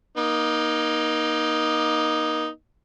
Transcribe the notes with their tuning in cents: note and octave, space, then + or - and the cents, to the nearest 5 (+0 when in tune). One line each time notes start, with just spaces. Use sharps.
A#3 +30 D#4 +0